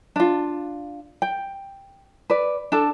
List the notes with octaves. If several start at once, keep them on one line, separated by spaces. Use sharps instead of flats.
D4 F4
G5
B4 D5
D4 A4